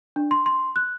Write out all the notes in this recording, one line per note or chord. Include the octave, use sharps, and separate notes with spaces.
D4
C6
C6
F#6